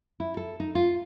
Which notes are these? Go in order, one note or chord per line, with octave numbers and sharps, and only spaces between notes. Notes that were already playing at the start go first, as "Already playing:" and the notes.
E4
A4
D#4
F4